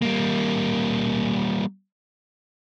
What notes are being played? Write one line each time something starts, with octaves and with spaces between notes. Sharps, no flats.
G3 A#3